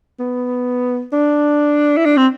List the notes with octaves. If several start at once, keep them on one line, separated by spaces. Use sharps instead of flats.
B3
D4
E4
D4
C4